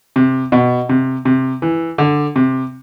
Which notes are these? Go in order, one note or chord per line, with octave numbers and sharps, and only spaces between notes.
C3
B2
C3
C3
E3
D3
C3